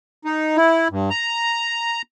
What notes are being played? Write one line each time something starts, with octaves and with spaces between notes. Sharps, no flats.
D#4
E4
G2
A#5